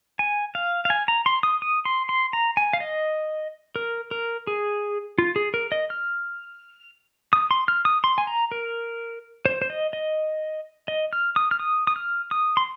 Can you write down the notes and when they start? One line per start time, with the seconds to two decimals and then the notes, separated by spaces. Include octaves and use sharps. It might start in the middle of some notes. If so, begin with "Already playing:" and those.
0.19 G#5
0.55 F5
0.85 F5
0.90 G#5
1.08 A#5
1.26 C6
1.43 D#6
1.62 D#6
1.85 C6
2.09 C6
2.33 A#5
2.57 G#5
2.73 F5
2.80 D#5
3.76 A#4
4.11 A#4
4.47 G#4
5.18 F4
5.36 G#4
5.54 A#4
5.72 D#5
5.90 F6
7.33 D#6
7.51 C6
7.68 F6
7.85 D#6
8.04 C6
8.18 G#5
8.27 A#5
8.52 A#4
9.46 C5
9.62 C5
9.70 D#5
9.93 D#5
10.88 D#5
11.13 F6
11.36 D#6
11.51 F6
11.60 D#6
11.87 D#6
11.96 F6
12.31 D#6
12.57 C6